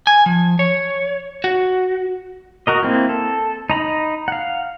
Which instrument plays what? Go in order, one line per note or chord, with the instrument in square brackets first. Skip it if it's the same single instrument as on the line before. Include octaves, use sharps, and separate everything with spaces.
[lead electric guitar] G#5
F3
C#5
F#4
[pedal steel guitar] F#4 A#4 D#5
A#3 C4 E4
A4
D#4 A#5 B5
F5 F#5